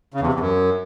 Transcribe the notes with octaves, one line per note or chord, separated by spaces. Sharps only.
C#3
E2
C3
E2
F#2